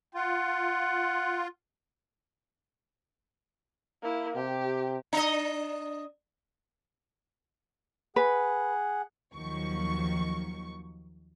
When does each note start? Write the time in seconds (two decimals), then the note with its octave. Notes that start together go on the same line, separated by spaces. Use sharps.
0.15 F4 F#5
4.02 A#3 E4
4.36 C3 G4
5.13 D4 D#5
8.16 G#4 B4 F#5
9.34 D#2 D#3 F3 F#3 C#6